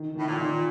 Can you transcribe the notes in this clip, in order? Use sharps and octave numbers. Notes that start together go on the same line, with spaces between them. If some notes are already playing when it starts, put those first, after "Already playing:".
Already playing: D#3
A2 D#3
A#2
D#3